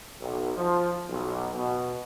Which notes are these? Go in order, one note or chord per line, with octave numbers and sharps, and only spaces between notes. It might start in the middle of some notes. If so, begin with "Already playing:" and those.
B1
F3
B1
B2